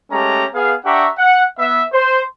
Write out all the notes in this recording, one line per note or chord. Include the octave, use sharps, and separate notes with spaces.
G#3 A3 C#4 G4 A5 A#5
B3 G#4 F5
D4 G4 E5 F#5 A#5 C#6
F#5
B3 E5
C5